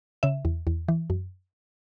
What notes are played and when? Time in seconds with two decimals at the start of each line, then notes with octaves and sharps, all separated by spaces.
0.23 C#3 E5
0.45 E2
0.67 E2
0.88 E3
1.10 F#2